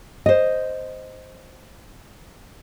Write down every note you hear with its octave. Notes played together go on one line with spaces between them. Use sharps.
C5 D#5